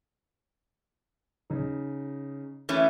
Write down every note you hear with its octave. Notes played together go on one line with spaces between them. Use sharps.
C#3 D#4
E3 A3 C#4